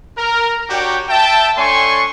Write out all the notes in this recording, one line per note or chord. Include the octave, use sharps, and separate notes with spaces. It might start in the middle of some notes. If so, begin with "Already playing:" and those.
A#4
D4 F#4 G4 C#5 G5
E5 G5 A5
A3 D4 C#5 G#5 C6 C#6